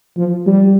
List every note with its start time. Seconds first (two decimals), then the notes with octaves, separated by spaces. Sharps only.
0.17 F3
0.46 G3